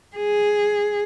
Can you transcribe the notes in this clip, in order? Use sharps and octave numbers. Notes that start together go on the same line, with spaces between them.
G#4